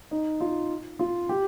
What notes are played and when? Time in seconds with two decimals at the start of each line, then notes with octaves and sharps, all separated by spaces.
0.11 D#4
0.40 F4
0.99 F4
1.29 G4